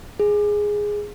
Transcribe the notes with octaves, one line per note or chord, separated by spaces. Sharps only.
G#4